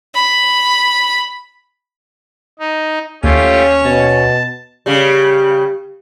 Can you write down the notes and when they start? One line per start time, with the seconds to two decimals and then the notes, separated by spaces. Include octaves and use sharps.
0.14 B5
2.59 D#4
3.24 D#2 A3 C#4 F4 G4 C#5
3.84 B2 A5
4.86 C#3 G3